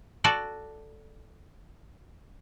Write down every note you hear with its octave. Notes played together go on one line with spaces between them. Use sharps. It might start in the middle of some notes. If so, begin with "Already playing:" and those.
F#4 A4 D5 F#5